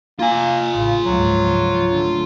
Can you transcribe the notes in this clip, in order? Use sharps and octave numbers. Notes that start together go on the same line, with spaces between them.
A#3 F4 G#5
A1 C#3
C#2 G#2 F3 F#3
D3 A3